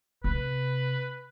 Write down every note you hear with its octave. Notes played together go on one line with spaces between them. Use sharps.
C3 B4